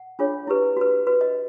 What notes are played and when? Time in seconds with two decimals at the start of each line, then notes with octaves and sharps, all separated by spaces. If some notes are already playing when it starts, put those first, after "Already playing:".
Already playing: F#5
0.19 D4 F4 G#4 C#5
0.47 E4 G4 B4
0.77 F#4 B4
1.07 F#4 B4
1.21 D#5